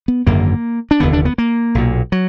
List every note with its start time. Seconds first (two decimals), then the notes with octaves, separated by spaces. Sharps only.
0.08 B3
0.27 G#1 F#2 D3 A#3
0.91 D4
1.00 F1 D#2 D3 B3
1.13 D4
1.25 B3
1.38 A#3
1.75 B1 A#2
2.12 F#3